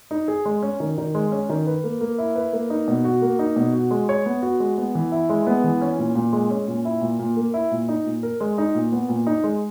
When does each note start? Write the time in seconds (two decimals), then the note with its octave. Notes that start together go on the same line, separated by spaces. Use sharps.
0.11 D#4
0.28 G#4
0.45 G#3
0.62 C#4
0.80 D#3
0.98 D#3
1.15 G#3
1.32 C#4
1.49 D#3
1.67 B4
1.84 A#3
2.01 A#3
2.18 E4
2.36 B4
2.53 A#3
2.70 D#4
2.88 B2
3.05 F#4
3.22 A#3
3.39 D#4
3.56 B2
3.73 F#4
3.91 G#3
4.09 C#5
4.26 B3
4.43 F#4
4.60 G#3
4.78 B3
4.95 E3
5.12 E4
5.29 G#3
5.47 B3
5.64 E3
5.82 C#4
5.98 A#2
6.15 A#2
6.33 G#3
6.50 C#4
6.67 A#2
6.85 E4
7.01 A#2
7.19 A#2
7.37 A#3
7.54 E4
7.71 A#2
7.88 D#4
8.06 A#2
8.23 A#4
8.40 G#3
8.58 D#4
8.75 A#2
8.92 B3
9.09 A#2
9.27 D#4
9.44 G#3